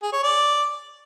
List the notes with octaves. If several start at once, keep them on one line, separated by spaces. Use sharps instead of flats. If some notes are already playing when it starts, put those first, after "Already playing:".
G#4
C#5
D5